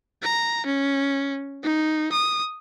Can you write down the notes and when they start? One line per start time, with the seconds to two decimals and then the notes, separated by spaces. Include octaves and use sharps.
0.23 A#5
0.66 C#4
1.63 D#4
2.12 D#6